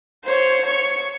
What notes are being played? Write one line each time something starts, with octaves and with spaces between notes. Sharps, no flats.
C5 C#5
C#5 C#6